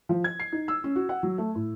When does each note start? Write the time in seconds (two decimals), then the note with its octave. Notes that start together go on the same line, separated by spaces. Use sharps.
0.09 F3
0.24 G#6
0.40 C7
0.52 D#4
0.68 E6
0.84 C#4
0.95 F#4
1.09 F#5
1.23 F#3
1.38 A3
1.55 A2